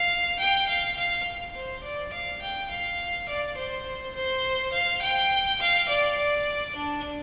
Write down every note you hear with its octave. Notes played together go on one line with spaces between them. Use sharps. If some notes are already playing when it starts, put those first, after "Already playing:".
Already playing: F5
G5
F5
F5
C5
D5
F5
G5
F5
D5
C5
C5
F5
G5
F5
D5
D5
D4